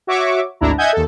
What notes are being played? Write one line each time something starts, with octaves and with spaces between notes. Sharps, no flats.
F#4 C#5 E5 C#6 D6
G#1 D2 D4 E4 A#5
D#5 E5 F#5 G#5 G6 G#6
D#2 A4